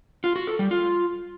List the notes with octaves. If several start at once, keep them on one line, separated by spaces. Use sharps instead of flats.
F4
F#4
A4
G3
F4